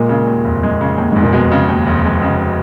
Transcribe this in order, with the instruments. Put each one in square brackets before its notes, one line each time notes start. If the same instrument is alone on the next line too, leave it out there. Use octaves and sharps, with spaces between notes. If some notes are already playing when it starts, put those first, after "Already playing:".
Already playing: [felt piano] A#2 [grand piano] G#3
[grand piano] C#3
D#2
F1
G#3
C#3
D#2
[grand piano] F1 [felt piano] G#2
[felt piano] A#2
[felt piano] B2 [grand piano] G#3
[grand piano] C#3
D#2
F1
G#3
C#3